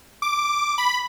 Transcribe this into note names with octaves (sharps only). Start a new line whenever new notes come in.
D6
B5